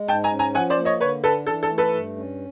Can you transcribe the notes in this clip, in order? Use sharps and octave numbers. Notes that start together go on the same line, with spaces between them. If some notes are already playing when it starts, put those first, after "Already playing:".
Already playing: G#3
G#2 G5 A5
G#5 A#5
C#4
G#5 A#5
F3 F#5 G#5
C5 D5
A#3
C#5 D#5
D3 B4 C#5
D4 A4 B4
E3 A4
A4
A3
A4 B4
G2
C#4